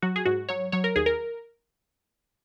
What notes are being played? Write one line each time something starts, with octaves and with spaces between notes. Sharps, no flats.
F#3 F#4
G#4
G#2 F#4
F#3 C#5
F#3 C#5
A#4
D#2 G#4
A#4